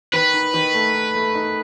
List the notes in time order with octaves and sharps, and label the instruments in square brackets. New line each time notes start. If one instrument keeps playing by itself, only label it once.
[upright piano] D#3 [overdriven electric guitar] B4
[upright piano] D#4
D#3
A3
D#4
A3
D#4